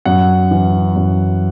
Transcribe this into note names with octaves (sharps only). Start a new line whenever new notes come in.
F#2 F#5
E3
F#2